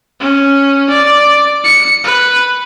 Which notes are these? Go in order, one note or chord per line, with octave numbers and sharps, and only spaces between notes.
C#4
D5
C#7
B4